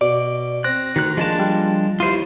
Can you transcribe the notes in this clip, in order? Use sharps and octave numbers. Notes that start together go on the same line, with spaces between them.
B2 D5
C4 F#6 A#6
D2 D#3 F#6
F3 G#3 A#3 D4 A5
G3
D#2 E4 F4 C5 D#6